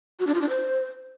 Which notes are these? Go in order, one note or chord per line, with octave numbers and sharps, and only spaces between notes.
F#4
D4
F4
D4
C5